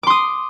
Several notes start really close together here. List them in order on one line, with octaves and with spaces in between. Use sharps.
D6 C6 D#6